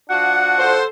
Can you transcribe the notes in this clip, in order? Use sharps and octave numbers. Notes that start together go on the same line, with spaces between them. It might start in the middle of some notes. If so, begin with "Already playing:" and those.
F3 D4 F#4 F#5
A4 C5